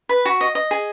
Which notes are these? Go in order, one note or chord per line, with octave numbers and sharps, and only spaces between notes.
B4
F#4
D#5
D#5
G#4